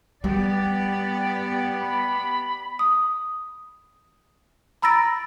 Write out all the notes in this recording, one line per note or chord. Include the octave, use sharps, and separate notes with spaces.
G3 B3 G4 D5
B5
D#6
A#5 B5 E6 A6 A#6 D7